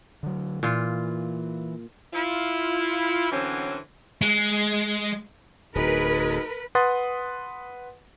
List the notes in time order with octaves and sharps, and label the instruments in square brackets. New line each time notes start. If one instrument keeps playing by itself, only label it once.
[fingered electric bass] D3 F#3
[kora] A#2 F4 [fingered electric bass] E3
[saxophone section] E4 F4
D3 E3 F#3 C4 C#4 C5
[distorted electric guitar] G#3
[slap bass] D1 [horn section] D#4 F#4 G#4 [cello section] A#4 B4
[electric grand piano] B4 F#5 C6 D#6 A6